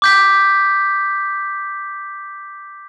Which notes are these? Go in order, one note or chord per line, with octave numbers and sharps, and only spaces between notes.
D6 G6 B6